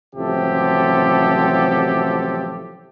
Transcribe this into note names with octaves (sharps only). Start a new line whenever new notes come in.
A1 C3 F3 F#3 G4 A4